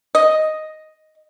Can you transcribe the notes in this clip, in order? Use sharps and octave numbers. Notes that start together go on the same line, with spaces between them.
D#5